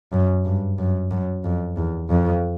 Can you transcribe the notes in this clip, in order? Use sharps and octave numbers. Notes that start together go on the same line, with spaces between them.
F#2
G2
F#2
F#2
F2
E2
F2